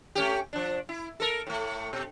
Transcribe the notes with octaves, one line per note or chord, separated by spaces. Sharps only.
A3 C#4 G4
F3 D4
E4
A4 A#4
A2 A3
B2